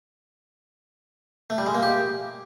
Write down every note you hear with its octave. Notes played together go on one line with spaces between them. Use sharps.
A3
G3
G#3
A#3
G4